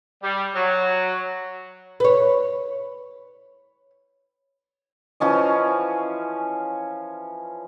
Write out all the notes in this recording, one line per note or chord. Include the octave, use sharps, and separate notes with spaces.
G3
F#3
B4 C#5
E3 F3 C#4 D#5